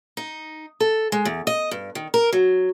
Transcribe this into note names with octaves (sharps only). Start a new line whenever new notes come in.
D#4
A4
G#3
E2
D#5
G2
D#3
A#4
F#3